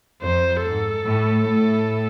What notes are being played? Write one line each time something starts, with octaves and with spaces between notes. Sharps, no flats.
F2 C5
G#2 A4
A2
A2